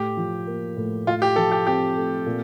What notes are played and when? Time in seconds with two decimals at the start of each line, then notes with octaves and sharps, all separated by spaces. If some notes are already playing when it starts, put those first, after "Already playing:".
Already playing: A2 G4
0.17 F3
0.47 A#3
0.77 A2
1.07 A2 F4
1.22 G4
1.36 F3 A4
1.52 G4
1.67 C4 G4
1.96 A3
2.26 A#2